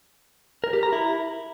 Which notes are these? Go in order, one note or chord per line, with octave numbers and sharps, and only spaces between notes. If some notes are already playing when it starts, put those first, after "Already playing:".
A#4
G4
A#5
E4